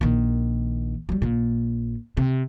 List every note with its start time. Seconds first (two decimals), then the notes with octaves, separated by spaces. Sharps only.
0.01 A#1 D#3
1.09 F#3 G3
1.22 A#1 A#2
2.17 C3